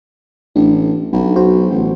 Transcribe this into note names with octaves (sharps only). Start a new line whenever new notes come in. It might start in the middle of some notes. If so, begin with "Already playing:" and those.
A1 D4
B1
F#4 C5
A1